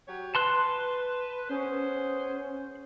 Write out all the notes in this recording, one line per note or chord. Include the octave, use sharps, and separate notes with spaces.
F#3 G4 C#5
B4 A5 C6 F#6
B3 C#4 G#4 C5